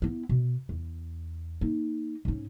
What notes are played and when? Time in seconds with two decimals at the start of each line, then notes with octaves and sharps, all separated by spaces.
0.02 B3 E4
0.29 B2
0.69 E2
1.61 A#3 D#4
2.25 G#2 C#4